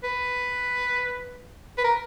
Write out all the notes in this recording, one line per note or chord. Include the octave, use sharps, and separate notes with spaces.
B4
B4
A#4